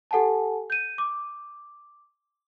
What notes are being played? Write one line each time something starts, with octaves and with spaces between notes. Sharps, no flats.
G4 A4 F#5 G#5 A5
G6 D#7
D6